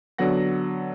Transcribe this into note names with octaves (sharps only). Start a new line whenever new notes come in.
D3 F#3 B3 F#5 A#6